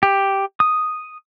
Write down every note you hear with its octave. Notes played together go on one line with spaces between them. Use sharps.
G4
D#6